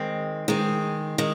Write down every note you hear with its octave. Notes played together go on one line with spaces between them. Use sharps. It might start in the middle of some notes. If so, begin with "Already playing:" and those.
Already playing: D#3 G#3 C4
D#3 G#3 C4
D#3 G#3